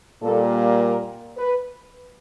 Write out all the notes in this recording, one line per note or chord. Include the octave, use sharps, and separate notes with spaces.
A#2 G3 A#3 A4
A#4
B4